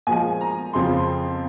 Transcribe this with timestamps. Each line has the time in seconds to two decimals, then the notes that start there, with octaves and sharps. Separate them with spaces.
0.07 A#2 F3 G#3 G#5
0.41 A#5
0.73 F2 C#3 F3 C6
0.97 C6